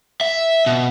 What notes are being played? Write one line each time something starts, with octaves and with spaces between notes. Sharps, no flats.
E5
B2